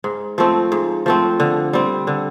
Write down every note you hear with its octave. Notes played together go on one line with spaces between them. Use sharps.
G#2
F3 A3 C4
G#2
F3 A3 C4
D3
G3 C4
D3